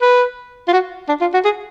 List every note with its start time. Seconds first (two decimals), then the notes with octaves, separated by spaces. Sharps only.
0.01 B4
0.68 F4
0.73 F#4
1.08 D4
1.21 F4
1.34 F#4
1.44 G#4